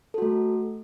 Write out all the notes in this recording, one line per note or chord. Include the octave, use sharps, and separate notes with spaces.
A3 F#4 A4